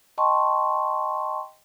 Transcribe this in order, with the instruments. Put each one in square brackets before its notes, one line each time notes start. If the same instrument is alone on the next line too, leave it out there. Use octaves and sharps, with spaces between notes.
[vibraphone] D#5 G5 A5 C6 C#6